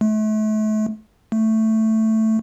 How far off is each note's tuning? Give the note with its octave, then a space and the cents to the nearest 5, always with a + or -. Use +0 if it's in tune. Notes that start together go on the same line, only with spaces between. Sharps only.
A3 -35
A3 +5